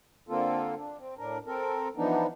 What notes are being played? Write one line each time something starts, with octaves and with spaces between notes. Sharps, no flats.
D3 A#3 C4 F4 A4
D4
C4
A2 D4 A#4
C4 A4 A#4
E3 F3 B3 D4 D#4